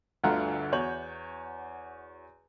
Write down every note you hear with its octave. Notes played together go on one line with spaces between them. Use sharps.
G1 D2 D3 F4 F#5 A#5
E2 F#4 C#5 G6 F#7